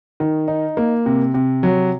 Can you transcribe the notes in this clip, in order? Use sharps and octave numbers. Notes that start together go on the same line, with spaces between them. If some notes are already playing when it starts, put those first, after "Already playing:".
D#3
D#4
A#3
C3
C3
F#3